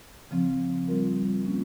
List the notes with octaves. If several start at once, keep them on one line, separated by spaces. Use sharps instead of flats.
C#3 F3 C4
G3 C4 F4 A#4
G3 A#3 C#4 F4